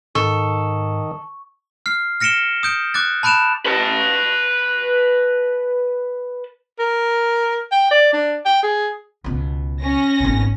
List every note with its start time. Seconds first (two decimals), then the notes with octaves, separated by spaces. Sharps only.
0.15 G#2 D#3 A4 C#6
1.86 F6 C7
2.20 F6 A#6 C#7 D7 E7 G7
2.63 D#6 G6 D7
2.94 D6 F#6 A6
3.23 A5 B5 F#6 D7 E7 F7
3.66 B4 A5
6.79 A#4
7.72 G5
7.91 D5
8.13 D4
8.46 G5
8.63 G#4
9.24 C#2 B2
9.81 C#4 A#6
10.20 G#1 B2